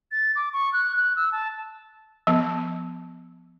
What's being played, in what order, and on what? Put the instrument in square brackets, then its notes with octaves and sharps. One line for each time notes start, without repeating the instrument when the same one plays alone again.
[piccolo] A6
D6
C#6
F#6
F#6
E6
A5
[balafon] F3 B3